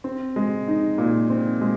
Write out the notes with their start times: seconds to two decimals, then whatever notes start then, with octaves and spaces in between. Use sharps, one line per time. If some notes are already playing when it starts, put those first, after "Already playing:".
0.04 C4
0.36 G#3
0.68 D#4
0.98 A#2
1.30 C4
1.61 G#3